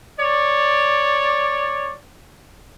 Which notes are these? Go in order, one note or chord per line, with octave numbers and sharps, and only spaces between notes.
C#5 D5